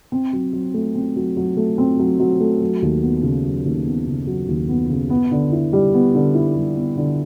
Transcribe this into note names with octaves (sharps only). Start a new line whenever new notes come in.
C4
F#3
F#3
A3
C4
F#3
F#3
A3
C4
F#3
F#3
A3
F#3
D#2
B3
C#3
F#3
D#2
B3
C#3
F#3
D#2
B3
C#3
B3
D3
E4
G3
B3
D3
E4
G3
B3
D3